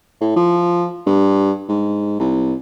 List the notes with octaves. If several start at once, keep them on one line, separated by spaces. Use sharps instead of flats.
A2
F3
G2
G#2
C2